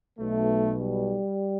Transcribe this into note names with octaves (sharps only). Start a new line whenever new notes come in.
B1 B2 A3
G3